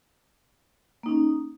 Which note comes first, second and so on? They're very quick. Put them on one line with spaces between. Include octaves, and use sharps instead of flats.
A#3 D#4 C#4